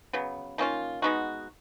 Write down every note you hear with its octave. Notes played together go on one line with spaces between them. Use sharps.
C#3 F#3 B3
D#3 A#3 C#4 F4
G#3 B3 D#4 F#4